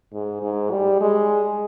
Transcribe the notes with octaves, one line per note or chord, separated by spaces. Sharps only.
G#2
G#2
G3
G#3